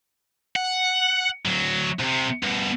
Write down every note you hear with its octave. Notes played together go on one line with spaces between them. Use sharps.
F#5
D2 F#3
C2 C3
G2 B2